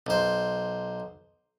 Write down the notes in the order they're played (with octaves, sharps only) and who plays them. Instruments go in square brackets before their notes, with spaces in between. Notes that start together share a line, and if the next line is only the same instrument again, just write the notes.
[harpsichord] B1 C5